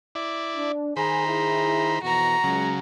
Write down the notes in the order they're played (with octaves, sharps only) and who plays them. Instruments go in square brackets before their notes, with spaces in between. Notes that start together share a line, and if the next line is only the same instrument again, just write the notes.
[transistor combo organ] E4 D5
[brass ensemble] D4
[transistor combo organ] D#3 C5 B5 [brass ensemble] G#4 G#5 [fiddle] A#5
[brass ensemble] E4 G#4
[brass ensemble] F2 B2 E3 [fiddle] F#4 A#5
[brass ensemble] C#2 [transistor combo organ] C#3 F#3